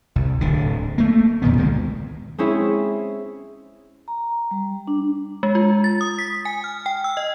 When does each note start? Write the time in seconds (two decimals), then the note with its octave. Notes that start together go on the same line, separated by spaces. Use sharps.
0.16 C2
0.41 D1 D3
0.98 A3 A#3
1.42 E2 A#2 D#3 B3
1.57 C#2 D#3 G#3
2.38 G#3 C4 C#4 E4 G#4 E5
4.08 A#5
4.51 G3
4.88 D4
5.43 G#3
5.55 F4
5.84 A6
6.01 D#6
6.19 B6
6.45 G#5
6.64 F6
6.86 G5
7.04 E6
7.17 D#5